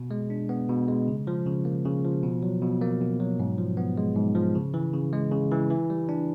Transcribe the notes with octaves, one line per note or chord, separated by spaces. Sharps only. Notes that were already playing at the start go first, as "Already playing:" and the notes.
Already playing: B2
G#3
D4
B3
B2
G#3
C#3
F3
C#3
A#3
C#3
F3
B2
F#3
B2
A#3
B2
F#3
G#2
F3
B3
G#3
G#2
F3
C#3
E3
C#3
G#3
C#3
E3
E3
G3
D4